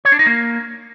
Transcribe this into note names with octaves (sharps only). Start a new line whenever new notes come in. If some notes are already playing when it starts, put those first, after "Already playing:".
C#5
D4
D#4
A#3